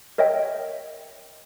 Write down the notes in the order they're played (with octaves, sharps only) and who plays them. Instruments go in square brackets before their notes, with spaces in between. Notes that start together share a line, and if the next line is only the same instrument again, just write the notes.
[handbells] A#4 C#5 D#5 E5 G5